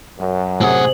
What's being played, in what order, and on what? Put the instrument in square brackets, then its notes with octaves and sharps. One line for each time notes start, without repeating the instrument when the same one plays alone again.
[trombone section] F#2
[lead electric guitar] A2 F#5 [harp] C3 [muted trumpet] G#4